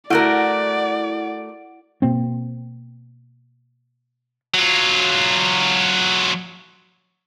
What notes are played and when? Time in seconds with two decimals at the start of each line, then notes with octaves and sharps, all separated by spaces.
0.10 A3 E4 F#4 A#4 D5 F#5 D7
2.02 B2 A#3 C4
4.54 F#3 F4